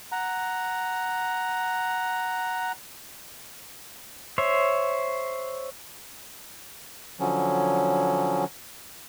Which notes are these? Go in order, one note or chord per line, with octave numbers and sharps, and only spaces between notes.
F#5 A#5
C5 C#5 E5
D3 F3 F#3 C#4